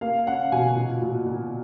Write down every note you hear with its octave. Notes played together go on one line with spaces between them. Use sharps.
A#3 F5
C#4 F#5
B2 G#5
A#2
A#2
A#2